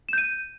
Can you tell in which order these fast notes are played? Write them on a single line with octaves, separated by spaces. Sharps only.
E7 G6 D#7